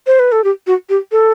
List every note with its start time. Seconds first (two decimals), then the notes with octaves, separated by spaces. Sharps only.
0.07 C5
0.19 B4
0.32 A4
0.44 G4
0.67 F#4
0.89 G4
1.12 A4